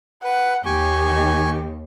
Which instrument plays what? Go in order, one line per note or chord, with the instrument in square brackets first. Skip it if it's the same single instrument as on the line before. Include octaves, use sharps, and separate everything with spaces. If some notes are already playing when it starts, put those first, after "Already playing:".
[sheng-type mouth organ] B4 [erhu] F#5
[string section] D#2 [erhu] G4 [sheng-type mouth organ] G#5 C#6
[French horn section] D#3